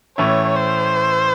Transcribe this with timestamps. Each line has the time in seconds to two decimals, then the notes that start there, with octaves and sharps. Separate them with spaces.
0.18 A2 E3 A3 C#4 E4 C#5
0.56 C5